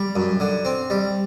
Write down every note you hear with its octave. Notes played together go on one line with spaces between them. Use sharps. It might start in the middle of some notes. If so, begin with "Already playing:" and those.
Already playing: G3
F#2
D3
C4
G3